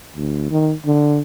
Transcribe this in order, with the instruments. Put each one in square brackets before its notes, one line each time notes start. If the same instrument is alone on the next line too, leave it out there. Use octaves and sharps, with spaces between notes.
[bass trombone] D2
D#3
D3